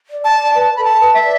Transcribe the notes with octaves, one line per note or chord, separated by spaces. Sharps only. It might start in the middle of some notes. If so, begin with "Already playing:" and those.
D5
A5
D5
B4 A5
A4 B5
A5
B4
E5
D5